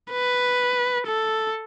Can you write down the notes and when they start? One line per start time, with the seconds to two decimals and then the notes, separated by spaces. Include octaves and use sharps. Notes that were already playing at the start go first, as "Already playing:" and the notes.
0.11 B4
1.07 A4